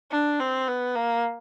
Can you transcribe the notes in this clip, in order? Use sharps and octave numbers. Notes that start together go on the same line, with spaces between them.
D4
C4
B3
A#3